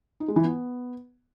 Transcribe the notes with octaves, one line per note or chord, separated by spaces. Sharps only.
D#4
G#3
E3
B3